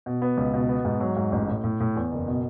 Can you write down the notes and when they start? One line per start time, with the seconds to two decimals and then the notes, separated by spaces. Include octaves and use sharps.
0.06 B2
0.22 B3
0.37 C#2
0.54 B2
0.69 B3
0.85 G#2
1.00 F#3
1.17 G#2
1.32 A1
1.48 A2
1.64 A2
1.80 A2
1.96 E2
2.12 F#1
2.28 B2